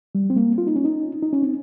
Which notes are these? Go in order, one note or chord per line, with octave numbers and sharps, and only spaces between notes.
G3
C4
A#3
F4
D#4
C#4
D#4
D#4
C#4
C4